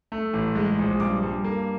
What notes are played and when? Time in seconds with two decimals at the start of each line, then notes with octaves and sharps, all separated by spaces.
0.12 A3
0.33 A1
0.55 G#3
0.78 A#1
1.00 G2 D6
1.22 G2
1.44 A#3